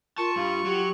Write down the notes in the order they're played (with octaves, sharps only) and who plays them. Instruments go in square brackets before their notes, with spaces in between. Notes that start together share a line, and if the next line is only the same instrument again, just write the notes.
[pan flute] F4 [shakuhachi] A#4 [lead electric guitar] A5 [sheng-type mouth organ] C#6
[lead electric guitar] G2 G3 [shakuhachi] F5
[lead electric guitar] F#3 [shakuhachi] G4